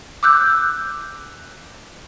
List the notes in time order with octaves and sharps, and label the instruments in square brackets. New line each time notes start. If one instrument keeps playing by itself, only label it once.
[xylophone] D6 E6 F#6 G6